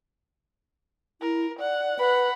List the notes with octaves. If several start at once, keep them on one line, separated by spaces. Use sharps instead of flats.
E4 A#4
D5 F#5
B4 F#5 B5